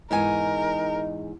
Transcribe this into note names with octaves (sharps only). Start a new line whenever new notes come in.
E2 G#2 D#4 A#4 G#5